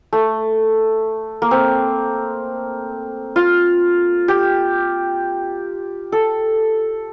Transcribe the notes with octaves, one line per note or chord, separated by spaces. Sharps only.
A3
A#3
C4
F4
G4
A4